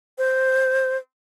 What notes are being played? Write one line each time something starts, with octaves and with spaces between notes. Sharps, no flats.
C5